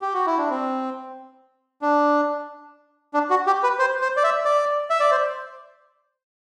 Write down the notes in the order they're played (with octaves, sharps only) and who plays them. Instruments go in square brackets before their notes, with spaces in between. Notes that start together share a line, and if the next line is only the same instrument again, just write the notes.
[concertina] G4
F#4
E4
D4
C4
D4
D4
F#4
G4
B4
C5
C5
D5
E5
D5
E5
D5
C5